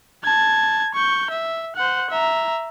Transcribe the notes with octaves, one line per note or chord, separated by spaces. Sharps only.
A5 G#6
C#6 G6
E5
C5 F#5
E5 A#5